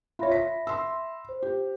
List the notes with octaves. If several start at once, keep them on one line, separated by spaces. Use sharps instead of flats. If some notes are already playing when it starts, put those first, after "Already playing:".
F4 C#5 E5 B5 A#6
B6
C6 E6
C5
G4